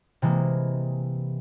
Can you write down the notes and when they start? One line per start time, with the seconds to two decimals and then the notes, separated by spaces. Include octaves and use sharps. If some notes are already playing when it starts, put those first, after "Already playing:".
0.22 C3 E3 G#3 A#3